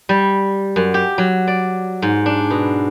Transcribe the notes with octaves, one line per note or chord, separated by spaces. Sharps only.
G3
F#2
G4
F#3
D5
G#2
D4
B2